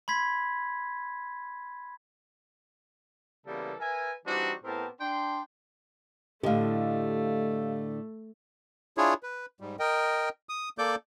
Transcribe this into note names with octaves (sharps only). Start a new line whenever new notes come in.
B5 C6 G#6 B6
C#3 E3 G3 A#3 B3 A4
A#4 B4 E5 G#5
E3 G3 C4 D4 D#4 F#4
A2 B3 C4 G4 A#4 A5
D4 G5 C6
A2 D3 A3 G4 D#5 F5
D4 E4 F4 G#4 C#5
B4
G#2 G3
A#4 D#5 G5
D#6
A#3 A4 D5 D6 G6